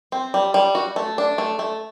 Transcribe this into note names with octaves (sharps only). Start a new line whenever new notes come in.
C4
G3
G3
F#4
A3
D4
A3
A3